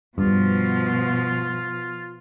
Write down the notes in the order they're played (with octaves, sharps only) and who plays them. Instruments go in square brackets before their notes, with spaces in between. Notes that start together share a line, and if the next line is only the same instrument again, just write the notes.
[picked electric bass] G2 [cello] B2 F3 [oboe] F4